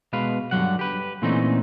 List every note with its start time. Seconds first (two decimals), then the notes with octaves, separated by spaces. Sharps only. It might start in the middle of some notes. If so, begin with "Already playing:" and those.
0.13 B2 G#3 B4 F5
0.51 G2 D3 F#3 F#5
0.79 G4 B4
1.22 A#2 E3 A3 C4 C#4 D#4